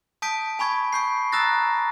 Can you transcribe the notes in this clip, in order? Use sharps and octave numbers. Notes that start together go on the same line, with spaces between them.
A5 D#6 G6 B6 D7
G#5 B5 C#6 G#6
C#6 G6 C7
A#5 D#6 E6 F#6 A6 A#6